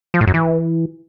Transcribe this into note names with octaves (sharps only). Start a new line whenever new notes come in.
F3
A2
F#2
E3